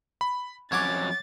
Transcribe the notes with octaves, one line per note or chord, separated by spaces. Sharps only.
B5
F2 F#3 C#4 C#5 F#5 D6 G#6 A6